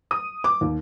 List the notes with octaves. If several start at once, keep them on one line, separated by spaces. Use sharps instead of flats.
D#6
D6
D#2